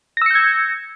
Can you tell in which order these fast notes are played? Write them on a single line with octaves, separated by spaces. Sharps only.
A#6 E6 C#7 G6 G#6